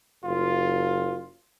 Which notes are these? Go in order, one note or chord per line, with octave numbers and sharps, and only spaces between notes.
F#1 F4